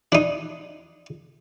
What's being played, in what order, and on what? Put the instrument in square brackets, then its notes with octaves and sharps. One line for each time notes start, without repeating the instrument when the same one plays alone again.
[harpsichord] D4 D#4